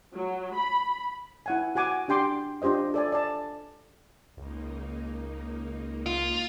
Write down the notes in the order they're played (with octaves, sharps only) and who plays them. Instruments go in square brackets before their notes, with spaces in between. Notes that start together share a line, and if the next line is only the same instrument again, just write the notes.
[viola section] F#3
B5
[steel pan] E4 F#5 G#5
F#4 F#5 G#5 D6
D4 G4 G5 C6 D6
D4 F4 G4 C5 D#5
A4 D5 G#5
D5 A5
[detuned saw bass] C#2 [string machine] A#3 D#4
[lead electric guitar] F4